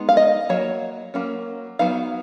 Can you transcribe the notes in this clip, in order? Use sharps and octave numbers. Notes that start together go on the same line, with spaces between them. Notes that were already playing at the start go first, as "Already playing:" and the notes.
Already playing: G#3 B3 D#4
F5
D#5
F#3 A#3 C#5
F#3 A#3 C#4
F#3 B3 D#4 F5